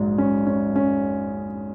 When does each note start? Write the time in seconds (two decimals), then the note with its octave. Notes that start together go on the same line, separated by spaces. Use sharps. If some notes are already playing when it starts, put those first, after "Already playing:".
Already playing: A#1 G#2 F#3
0.18 C#4
0.47 C#4
0.76 C#4